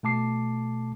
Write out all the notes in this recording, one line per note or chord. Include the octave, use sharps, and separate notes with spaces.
B2 A3 A5 D6 C7